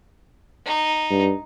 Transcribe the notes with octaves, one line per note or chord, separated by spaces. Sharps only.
D#4
G2